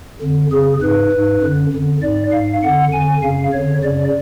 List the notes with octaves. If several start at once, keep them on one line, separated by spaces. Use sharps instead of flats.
F2 D3
F2 C#3 G#4
G#2 B4
G#2
F#2 D3
F2 D3
G#2 D5
G#2 F5
F2 D3 F#5
F2 D3 G#5
F#2 C#3 F5
F2 D3 C#5
F#2 C#3 D5